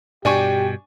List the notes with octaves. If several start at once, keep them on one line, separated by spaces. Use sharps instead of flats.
G2 B2 D4 G4 G#5 C#6